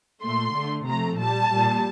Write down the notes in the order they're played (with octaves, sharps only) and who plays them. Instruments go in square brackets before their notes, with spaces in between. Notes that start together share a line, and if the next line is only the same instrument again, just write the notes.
[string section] A#2 A3 C6
D3 A3
C3 F3 A3 A#5
A#2 G3 A5
A#2 G3